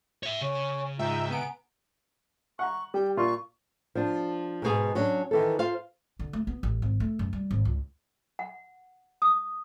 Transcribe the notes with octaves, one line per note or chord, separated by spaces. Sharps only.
C#5 E5
C#3 C#5 G#5 C#6
G#2 F4 E5 G5 A#5
B3 F#5 G#5 A#5 D7
F#5 A#5 C#6
G3 G5
A#2 F4 C6 C#6
F3 D4
G#2 B2 G#4
F#3 C#4 D4
D#3 E3 A4
F4 C5 F5
D3
A3
B3
A1
G#1
A3
F#2
G3
G#1
C#2
F#5
D#6